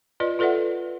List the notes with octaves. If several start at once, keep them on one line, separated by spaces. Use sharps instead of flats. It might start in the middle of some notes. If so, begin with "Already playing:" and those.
F4 B4 D5 D#5
F4 A4 B4 D5 E5 F#5